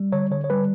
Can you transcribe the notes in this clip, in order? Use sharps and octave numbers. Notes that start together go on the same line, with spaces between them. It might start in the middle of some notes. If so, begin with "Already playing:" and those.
Already playing: G3
D3 C#5
D3 C#5
C#5
G3 B4